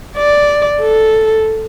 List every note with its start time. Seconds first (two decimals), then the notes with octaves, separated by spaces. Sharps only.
0.17 D5
0.81 A4